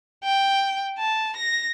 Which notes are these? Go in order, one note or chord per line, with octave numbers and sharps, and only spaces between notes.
G5
A5
A#6